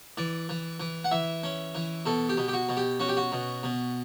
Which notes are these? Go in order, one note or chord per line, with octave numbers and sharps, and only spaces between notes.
E3 D5
E3
E3
F#5
E3 E5
C#4
E3
B2 A4
G4
B2
G4
F#4
B2
G4
C#4 F#4
G4
F#4
B2
B2